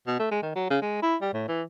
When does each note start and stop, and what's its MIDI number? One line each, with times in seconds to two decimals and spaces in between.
0.07 0.17 47
0.19 0.26 57
0.31 0.41 56
0.42 0.54 51
0.55 0.70 54
0.70 0.78 49
0.82 1.02 56
1.02 1.16 64
1.21 1.32 55
1.33 1.48 45
1.48 1.63 52